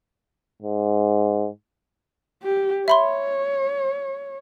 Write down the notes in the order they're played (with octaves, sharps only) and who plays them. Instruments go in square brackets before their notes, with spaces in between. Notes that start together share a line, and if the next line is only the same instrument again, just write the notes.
[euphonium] G#2
[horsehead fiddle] G4
[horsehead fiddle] C#5 [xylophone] E5 B5 C6